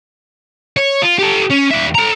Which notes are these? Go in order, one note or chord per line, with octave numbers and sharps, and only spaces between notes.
C#5
F4
G4 A4
C#4
D#2 E5
A4 A#5